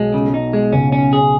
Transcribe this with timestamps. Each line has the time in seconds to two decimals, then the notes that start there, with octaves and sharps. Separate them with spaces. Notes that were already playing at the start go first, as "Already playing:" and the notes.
Already playing: B1 B2 G#3
0.14 C#3
0.34 D#4
0.53 G#3
0.73 C#2 C#3 C#4
0.92 C#4
1.13 G#4